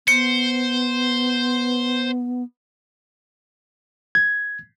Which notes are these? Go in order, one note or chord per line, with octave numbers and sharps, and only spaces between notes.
B3 C5 C#7
G#6